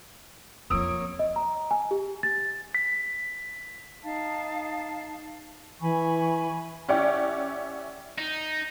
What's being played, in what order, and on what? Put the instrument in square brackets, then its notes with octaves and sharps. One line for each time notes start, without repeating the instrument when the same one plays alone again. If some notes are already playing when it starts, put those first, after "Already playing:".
[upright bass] F2 F3 [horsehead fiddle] A#3 C#5 [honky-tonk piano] D#6 E6 D7
[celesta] D#5
A#5
G#5
G4
A6
[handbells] B6
[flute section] D#4 F5 A5
[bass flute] E3 [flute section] G#5 B5 C#6
[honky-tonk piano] C#4 E4 G4 D5 F#5 G5
[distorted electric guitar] D#4